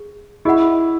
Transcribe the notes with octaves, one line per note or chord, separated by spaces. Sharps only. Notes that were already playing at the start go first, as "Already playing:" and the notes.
Already playing: G#4
E4 G#4 D#5 F#5 B5